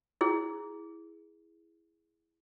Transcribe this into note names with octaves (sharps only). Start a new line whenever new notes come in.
E4 G#4